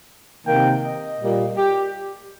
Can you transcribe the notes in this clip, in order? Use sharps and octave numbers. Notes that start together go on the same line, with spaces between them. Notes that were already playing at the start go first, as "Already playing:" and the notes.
C3 D#3 A#3 G5
D#5
A#2 G3 A#3
G4